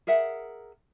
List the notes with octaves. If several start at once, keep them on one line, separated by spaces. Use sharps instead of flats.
G#4 A#4 E5 F#5